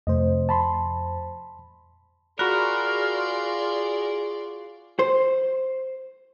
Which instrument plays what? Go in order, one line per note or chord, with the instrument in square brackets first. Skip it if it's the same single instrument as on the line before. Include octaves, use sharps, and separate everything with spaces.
[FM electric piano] F2 C5 [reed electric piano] C3 A3 D#5
[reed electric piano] A5 B5 C6
[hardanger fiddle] F4 D5 [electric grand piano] F#4 B5 F#6 [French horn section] G#4 [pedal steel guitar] A#4
[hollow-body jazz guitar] C5